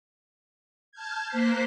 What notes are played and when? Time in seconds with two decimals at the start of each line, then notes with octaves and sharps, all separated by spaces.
0.92 A5 F6 G6 G#6
1.28 A#3 C5 F#6 B6 C7